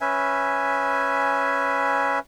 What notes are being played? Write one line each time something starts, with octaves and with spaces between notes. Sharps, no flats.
C#4 B4 E5 G#5